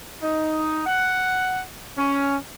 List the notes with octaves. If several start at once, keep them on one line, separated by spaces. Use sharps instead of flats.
D#4
F#5
C#4